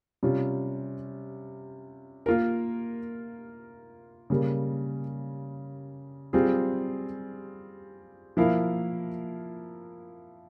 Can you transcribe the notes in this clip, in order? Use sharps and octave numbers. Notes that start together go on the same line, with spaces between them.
C3 G3 C#4 F4
A#3 F4 A#4
C#3 G3 A#3
G3 C4 F4 G#4
F3 A#3 E4 A#4 F5